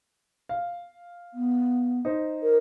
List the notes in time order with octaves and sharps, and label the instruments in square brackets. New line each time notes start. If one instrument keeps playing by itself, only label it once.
[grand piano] F5
[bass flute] B3
[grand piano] D#4 C5
[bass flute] A#4